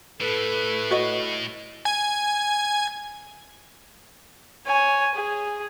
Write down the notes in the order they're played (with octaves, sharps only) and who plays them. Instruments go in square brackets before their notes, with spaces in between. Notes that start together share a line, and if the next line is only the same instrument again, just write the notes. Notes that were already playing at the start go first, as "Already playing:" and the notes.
[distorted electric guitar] A2 [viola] A4 [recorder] B4
[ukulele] F#4 C#5 D#5
[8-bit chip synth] G#5 G#6
[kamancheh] C#5 G#5
G#4